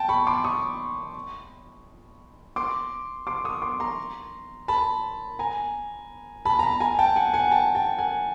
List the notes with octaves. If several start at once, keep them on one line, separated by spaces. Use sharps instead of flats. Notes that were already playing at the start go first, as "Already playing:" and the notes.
Already playing: G5 A5
B5 C#6
C6 D6
C#6 D#6
C6 D6
C6 D6
C#6 D#6
C6 D6
A#5 C6
A5 B5
G#5 A#5
A5 B5
A#5
A5 B5
G#5 A#5
G5 A5
F#5 G#5
F#5 G#5
G5 A5
G5 A5
F#5 G#5